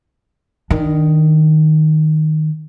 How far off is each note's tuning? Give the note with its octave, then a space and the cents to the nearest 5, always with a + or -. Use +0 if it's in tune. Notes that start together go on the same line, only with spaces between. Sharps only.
D#3 +0 D4 +20